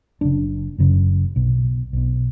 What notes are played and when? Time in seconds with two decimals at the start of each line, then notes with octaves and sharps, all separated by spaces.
0.21 F#1 F#2 C#3 D4
0.78 F#1 F#2 C#3
1.36 B1 B2
1.93 B1 B2